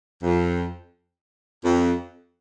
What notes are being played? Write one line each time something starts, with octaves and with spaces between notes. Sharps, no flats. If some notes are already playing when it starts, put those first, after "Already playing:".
F2
F2